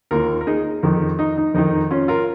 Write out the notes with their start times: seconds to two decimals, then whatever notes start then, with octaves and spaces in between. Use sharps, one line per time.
0.11 D#2 D#3 F4 A#4
0.41 A#4
0.47 D#4 G#4
0.83 F2 D#3 D#4
1.19 D#4
1.37 D#4
1.54 F2 D#3 D#4
1.91 C#4 F4
2.08 F4 A#4